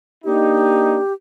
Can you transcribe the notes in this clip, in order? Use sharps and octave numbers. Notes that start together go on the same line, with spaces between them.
A#3 D4 D#4 G4